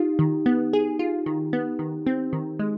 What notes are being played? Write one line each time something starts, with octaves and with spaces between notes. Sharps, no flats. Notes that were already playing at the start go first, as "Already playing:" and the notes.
Already playing: D#4 F4 G4
D#3
B3
G#4
F4
D#3
B3
D#3
C4
D#3
G#3